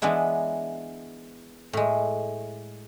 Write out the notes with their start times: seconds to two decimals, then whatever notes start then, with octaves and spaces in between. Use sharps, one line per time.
0.02 E3 G#3 B3 D4 E4
1.73 A2 G#3